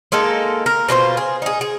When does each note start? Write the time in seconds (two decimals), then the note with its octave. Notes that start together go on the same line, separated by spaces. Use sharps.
0.12 G#3 A#3 D#4 A4
0.66 A#4
0.89 B2 D4 F4 C5
1.17 G#4
1.42 D#4 G#4
1.61 G#4